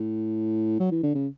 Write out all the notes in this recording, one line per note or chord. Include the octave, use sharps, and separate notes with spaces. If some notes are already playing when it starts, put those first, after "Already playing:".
Already playing: A2
F#3
E3
D3
C#3